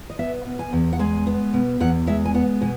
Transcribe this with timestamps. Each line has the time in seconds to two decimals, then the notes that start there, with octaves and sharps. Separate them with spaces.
0.10 D#5
0.19 B3 E5
0.45 B2
0.59 G#5
0.73 E2
0.93 F#5
0.99 G#3 G#5
1.27 B3
1.53 B2
1.80 E2 F#5
2.07 G#3 E5
2.25 G#5
2.34 B3 F#5
2.61 B2 G#5